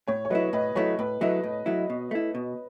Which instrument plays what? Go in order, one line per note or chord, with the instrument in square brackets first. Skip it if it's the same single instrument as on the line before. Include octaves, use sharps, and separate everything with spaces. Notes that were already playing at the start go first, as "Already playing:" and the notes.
[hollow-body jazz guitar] A2 [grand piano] C#5
[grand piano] C#5
[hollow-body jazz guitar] F#3 A3 E4 [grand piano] B4 D#5
[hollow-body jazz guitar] A2 [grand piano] B4 D#5
[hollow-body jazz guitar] F#3 A3 E4 [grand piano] C#5
[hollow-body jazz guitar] A2 [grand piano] B4
[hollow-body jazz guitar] F#3 A3 E4 [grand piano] B4 D#5
[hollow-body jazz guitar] A2
F#3 A3 E4
B2
A3 E4
B2